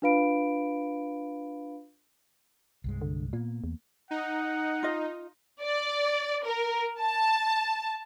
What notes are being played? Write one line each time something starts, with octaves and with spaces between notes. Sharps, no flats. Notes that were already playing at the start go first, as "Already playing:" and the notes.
D4 F4 B4 F5 B5 D7
C2 G2 G#3
D3
A#2 A#3 B3
E2
D#4 F#5
F4 D#5
D5
A#4
A5